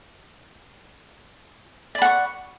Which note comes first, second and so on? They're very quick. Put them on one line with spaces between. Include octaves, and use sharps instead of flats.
D5 B5 F#5 C#6